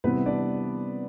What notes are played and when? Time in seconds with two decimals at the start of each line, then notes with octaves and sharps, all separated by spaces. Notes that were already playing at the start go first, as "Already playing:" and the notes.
0.04 C3 E3 G3 B3 C4 B4
0.26 D4 D5